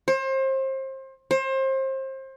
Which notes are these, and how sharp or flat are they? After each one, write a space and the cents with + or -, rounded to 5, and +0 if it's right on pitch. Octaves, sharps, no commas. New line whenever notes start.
C5 +30
C5 +30